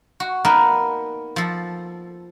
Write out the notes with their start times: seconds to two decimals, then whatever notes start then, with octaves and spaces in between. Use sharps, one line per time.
0.20 F#4
0.45 A#3 B3 D#4 A#4 B4
1.36 F3 A4